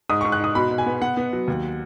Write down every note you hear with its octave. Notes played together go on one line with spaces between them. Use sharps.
G#2 D#6
C#6
G#2
F#6
D#4 D#6
B2 B5
B2
G#5
B3
B3 F#5
B3
F#3
D#2